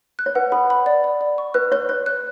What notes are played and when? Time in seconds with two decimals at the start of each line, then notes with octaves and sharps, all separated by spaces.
0.19 F#6
0.26 C#5
0.35 B4 F#5
0.52 A4 B5
0.70 B5
0.86 D5
1.04 D5
1.21 D5
1.38 C#6
1.54 B4 F#6
1.72 C#5 F#6
1.89 C#5 F#6
2.06 F#6